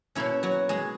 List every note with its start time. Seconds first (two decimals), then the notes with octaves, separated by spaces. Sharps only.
0.15 B2 A#3 C#4 E4
0.43 F#3 F#4
0.69 G#3 G#4